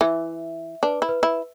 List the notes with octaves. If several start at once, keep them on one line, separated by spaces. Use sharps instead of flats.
E3 E5
D4 B4
E4
B4
E4